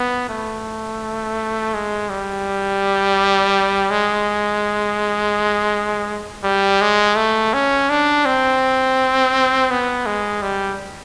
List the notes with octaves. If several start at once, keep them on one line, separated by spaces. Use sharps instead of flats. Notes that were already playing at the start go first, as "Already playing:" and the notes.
Already playing: B3
A3
G#3
G3
G#3
G3
G#3
A3
C#4
D4
C4
B3
G#3
G3